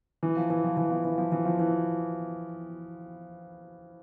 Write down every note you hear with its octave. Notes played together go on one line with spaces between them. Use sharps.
E3
F3
E3
F3
E3
F3
E3
F3
E3
F3
E3